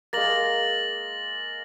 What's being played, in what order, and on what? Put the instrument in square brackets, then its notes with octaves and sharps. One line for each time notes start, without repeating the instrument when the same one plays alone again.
[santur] G#3 A#3 [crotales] A6 A#6 F#7